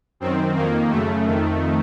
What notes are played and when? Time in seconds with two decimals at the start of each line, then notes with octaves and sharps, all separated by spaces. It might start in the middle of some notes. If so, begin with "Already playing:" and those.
0.20 F#2 D#3 C4
0.55 F2 D#3 A#3
0.90 F#2 C#3 A3
1.26 F2 D#3